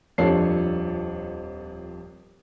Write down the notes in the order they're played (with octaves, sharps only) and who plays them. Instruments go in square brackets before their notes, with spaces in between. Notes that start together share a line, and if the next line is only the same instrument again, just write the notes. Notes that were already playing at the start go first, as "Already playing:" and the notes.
[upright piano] D#1 F2 D4 A4 C#5 C7